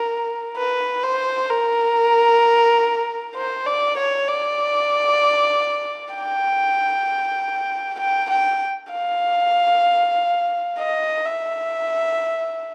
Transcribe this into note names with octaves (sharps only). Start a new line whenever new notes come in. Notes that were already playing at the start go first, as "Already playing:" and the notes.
Already playing: A#4
B4
C5
A#4
C5
D5
C#5
D5
G5
G5
G5
F5
D#5
E5